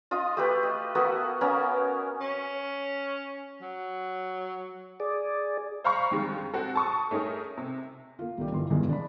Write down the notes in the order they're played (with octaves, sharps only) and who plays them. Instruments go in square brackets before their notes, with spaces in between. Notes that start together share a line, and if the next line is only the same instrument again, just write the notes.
[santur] F4 D#5 C6 D#6
A3 G4 B4
D#5
A#3 B3 F#4 A4
A#3 B3 C#4 A#4
[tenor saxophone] C#4
F#3
[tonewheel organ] G#4 D5
[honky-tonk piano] C5 F5 A#5 B5 C#6
F2 D3 D#3 G3 G#3
G#3 C4 F#4 A4
A5 C#6 D#6
A3 C#4 D#4 G#4 A#4
C3
[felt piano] A#3 F4
C2 D#3 G3
G1 G2 E3 C6
G2 B2 D#3 E3 G#3
D4 B5